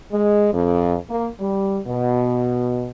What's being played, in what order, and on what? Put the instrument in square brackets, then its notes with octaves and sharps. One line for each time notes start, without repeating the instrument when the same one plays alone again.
[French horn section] G#3
F2
A#3
G3
B2